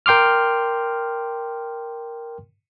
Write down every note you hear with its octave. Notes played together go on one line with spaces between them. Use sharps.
A#4 G5 C6 D6 F6